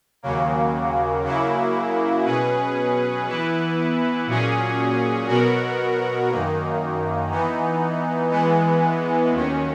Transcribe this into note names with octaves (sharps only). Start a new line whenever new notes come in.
D#2 C#3 F#3 A#3
C#3 F#3 A#3 E4
B2 F#3 C#4 G#4 B4
E3 B3 E4 B4
A#2 F#3 C#4 G#4
B2 F#3 B3 F#4 A#4
F#2 D#3 F#3 A#3 D#4
E3 B3 D#4
E3 G#3 B3
D#2 D#3 F#3 C#4